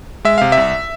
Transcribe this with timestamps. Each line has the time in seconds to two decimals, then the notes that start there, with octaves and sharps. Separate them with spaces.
0.25 G#3 E5
0.38 C3 F5
0.52 E5
0.57 C2